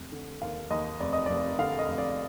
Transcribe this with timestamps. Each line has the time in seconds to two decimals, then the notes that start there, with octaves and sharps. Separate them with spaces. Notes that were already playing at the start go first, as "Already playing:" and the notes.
Already playing: F1
0.12 D3
0.42 D#2 F5
0.70 D#2 D#5
1.00 F1 D5
1.13 D#5
1.26 F1 D5
1.59 D3 F5
1.79 D#5
1.88 F1
1.98 D5